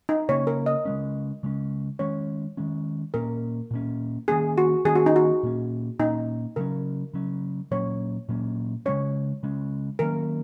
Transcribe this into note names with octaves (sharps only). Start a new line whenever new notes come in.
D#4
C#3 A#3 C#4 C#5
A#4
D#5
C#3 G#3 C#4
C#3 G#3 C#4
D#3 G#3 C#4 C#5
D#3 G#3 C#4
A#2 A#3 C#4 A#4
A#2 A#3 C#4
D#3 A#3 C#4 G#4
F#4
D#3 A#3 C#4 G#4
F#4
D#4
F#4
A#2 A#3 C#4
A#2 A#3 C#4 D#4
C#3 F#3 C#4 A#4
C#3 F#3 C#4
A#2 F#3 A#3 C#4 C#5
A#2 F#3 A#3 C#4
C#3 G#3 C#4 C#5
C#3 G#3 C#4
D#3 F#3 A#3 C#4 A#4